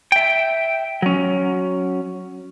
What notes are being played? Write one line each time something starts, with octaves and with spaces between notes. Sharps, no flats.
E5 G5
F#3 C#4